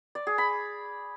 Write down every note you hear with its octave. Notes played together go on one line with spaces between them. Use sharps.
D5
G#4
B5